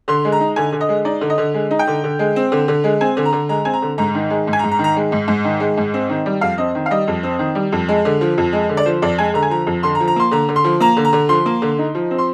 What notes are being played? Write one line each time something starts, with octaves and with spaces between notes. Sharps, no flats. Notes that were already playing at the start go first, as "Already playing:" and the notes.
D3 C6
G#3
A#5
D#4
D3 G#5
D3
D#5
G#3
D#4 D5
D3
D#5
D3
G#3
D#4
G5
D3
D3
G#3
C4
D3
D3
G#3
C4 G#5
D3
A#5
D3
G#3 A#5
C4 G#5
A#5
D3
G#2 A#5
D#3
G#3
G#2
G#5
A#5
G#2
A#5
D#3
A#5
G#3
G#2
G#2
D#3
G#3
G#2
C4
D#3
G3
F2 F5
C4 D#5
D#3
F5
G3 D#5
F2
C4
D#3
G3
F2
G#3
D3
F3
F2
G#3
D3
D5
F3 C5
F2 D5
G#3 G#5
D3 A#5
G#5
F3 A#5
F2
D3 C6
A#5
F3
A#5
A#3 C6
D3 A#5
D3
C6
F3
A#3 A#5
D3
A#5
D3
F3 C6
A#3
D3
D#4
F3
C4
C6